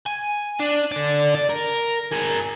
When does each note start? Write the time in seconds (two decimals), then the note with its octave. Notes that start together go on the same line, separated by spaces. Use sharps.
0.06 G#5
0.60 D4
0.92 D3 D5
1.35 D5
1.49 A#4
2.12 G#4 A#4